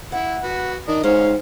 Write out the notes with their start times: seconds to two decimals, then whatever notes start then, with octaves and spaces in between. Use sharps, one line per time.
0.12 E4 F#5
0.43 F#4 B4
0.88 D#3 D4 D#4 D#5
1.03 D2 G#2 C#4 C5 F5